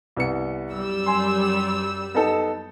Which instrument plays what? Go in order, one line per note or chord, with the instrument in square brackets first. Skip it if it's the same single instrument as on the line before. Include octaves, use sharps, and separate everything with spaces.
[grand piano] C2 B3 C#7
[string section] F#2 G3 E6
[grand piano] G#5 C6
B3 D#4 A4